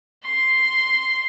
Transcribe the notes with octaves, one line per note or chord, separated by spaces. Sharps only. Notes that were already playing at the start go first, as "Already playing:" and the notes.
C6